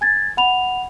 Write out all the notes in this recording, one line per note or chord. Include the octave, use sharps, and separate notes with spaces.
G#5 G#6 A6
F#5 B5 F7